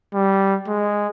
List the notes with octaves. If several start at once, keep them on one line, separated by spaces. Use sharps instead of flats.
G3
G#3